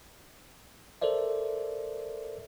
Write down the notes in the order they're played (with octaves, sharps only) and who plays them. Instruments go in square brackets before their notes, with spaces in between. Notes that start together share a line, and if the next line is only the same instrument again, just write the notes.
[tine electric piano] A4 A#4 C5 D5 E5